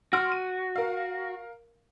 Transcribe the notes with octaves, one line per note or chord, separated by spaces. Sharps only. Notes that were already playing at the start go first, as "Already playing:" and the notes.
F#4 C6 F6 D7
D#7
A#4 F5